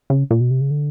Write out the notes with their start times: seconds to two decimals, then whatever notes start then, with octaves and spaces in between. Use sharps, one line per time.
0.10 C#3
0.30 A#2
0.41 B2
0.51 C3
0.61 C#3
0.71 D3